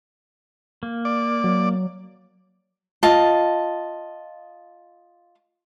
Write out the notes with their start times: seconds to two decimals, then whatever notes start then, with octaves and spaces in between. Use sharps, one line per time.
0.83 A#3
1.05 D5
1.44 F#3
3.03 F4 D#5 A5